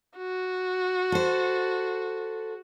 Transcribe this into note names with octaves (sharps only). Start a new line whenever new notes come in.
F#4
A4 C5